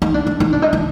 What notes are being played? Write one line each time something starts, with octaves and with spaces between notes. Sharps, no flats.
D#4
D4
D4
D#4
D4
D#4
D4